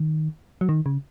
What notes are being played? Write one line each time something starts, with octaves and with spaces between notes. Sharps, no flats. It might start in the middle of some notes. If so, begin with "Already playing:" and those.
Already playing: D#3
F#3
D#3
C#3